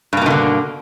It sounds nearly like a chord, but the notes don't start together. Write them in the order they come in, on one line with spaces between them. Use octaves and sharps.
G2 A#3 B2 D#3 D3